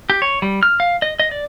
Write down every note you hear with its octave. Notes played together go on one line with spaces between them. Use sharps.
G4
C#5
G3
F6
F5
D#5
D#5
D5